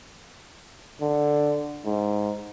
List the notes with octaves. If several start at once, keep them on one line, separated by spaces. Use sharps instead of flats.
D3
G#2